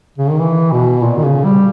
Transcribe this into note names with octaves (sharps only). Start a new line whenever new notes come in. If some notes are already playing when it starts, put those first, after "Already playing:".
C#3
D#3
E3
B2
A#2
D#3
C#3
G3